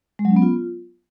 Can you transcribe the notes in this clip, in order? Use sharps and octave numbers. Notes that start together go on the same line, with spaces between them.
G#3
F#3
C#4
B3
F4